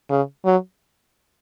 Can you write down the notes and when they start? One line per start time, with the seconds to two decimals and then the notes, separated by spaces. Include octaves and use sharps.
0.10 C#3
0.45 F#3